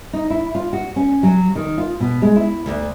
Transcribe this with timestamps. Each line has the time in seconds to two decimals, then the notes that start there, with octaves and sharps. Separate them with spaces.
0.13 D#4
0.30 E4
0.55 F4
0.73 F#4
0.96 C#4
1.23 F#3
1.55 D#3
1.78 F4
2.00 B2
2.22 G#3
2.36 E4
2.66 D2